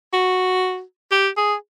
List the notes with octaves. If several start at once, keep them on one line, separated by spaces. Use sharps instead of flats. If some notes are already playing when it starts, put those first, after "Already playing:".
F#4
G4
G#4